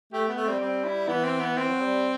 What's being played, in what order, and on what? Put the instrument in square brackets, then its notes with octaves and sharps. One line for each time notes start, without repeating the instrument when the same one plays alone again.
[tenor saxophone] A3 [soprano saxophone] G4
[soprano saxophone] B3
[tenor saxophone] A3
[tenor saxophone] G3 [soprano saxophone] C4
[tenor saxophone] G3 [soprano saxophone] C4
[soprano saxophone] E4
[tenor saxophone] E3 [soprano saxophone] B3
[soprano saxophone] C4
B3
[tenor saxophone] E3 [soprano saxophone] C4
[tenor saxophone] F#3
G3